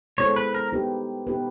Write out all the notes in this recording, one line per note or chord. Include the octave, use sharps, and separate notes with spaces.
G#3 B3 E4 A4 C5 C#5
B4
A#4
B3 D#4 G4 B4
B3 D#4 G4 B4